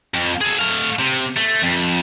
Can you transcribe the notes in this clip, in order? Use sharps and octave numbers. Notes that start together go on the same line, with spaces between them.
F2
G#4 A4
A3 F5
C3
A3
F2